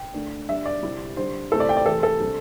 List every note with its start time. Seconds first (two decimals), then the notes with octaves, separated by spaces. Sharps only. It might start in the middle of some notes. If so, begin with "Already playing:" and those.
Already playing: G5
0.13 D3 A3 D4
0.48 D3 G3 D4 E5
0.66 D5
0.82 C3 G3 E4
1.17 D3 G3 D4 C5
1.52 C3 A3 C4 E4 A4
1.60 D5
1.69 G5
1.77 D5
1.86 C3 E3 A3 A4
2.03 A4
2.20 C3 G3 D4